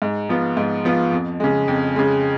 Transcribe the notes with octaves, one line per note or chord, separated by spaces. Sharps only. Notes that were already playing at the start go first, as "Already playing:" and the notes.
G#2
F3 B3 F4
G#2
F3 B3 F4
F2
C#3 G#3
F2
C#3 G#3